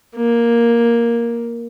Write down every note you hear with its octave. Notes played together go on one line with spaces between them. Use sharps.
A#3